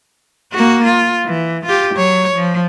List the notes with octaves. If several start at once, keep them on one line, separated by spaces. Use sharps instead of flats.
A#3 F#4
F4
E3
F4 G4
F#3 C#5
F3